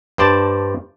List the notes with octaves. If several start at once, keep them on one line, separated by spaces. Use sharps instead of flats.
G2 C5 D5 A5